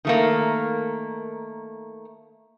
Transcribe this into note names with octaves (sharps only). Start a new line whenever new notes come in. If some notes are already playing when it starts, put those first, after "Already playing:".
D#3 A3 A#3